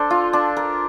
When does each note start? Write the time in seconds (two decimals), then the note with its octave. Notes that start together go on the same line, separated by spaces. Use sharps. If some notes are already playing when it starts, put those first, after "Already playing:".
Already playing: D4 A4 C5
0.10 F4
0.33 D4
0.57 A#4